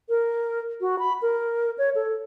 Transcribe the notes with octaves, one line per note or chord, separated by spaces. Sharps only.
A#4
F#4
B5
A#4
C#5
A4